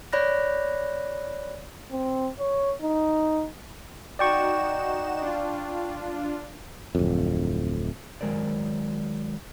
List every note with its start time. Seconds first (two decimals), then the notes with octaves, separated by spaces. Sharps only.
0.13 C#5 D5 B5 F#6 A#6
1.91 C4
2.39 C#5
2.82 D#4
4.19 D#4 F#4 D5 G5 C#6 E7
5.21 D4 F4
6.95 D1 F2
8.21 D#3 F#3 G#3 A#4 C5 D5